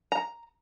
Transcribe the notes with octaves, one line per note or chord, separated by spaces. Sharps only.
A#5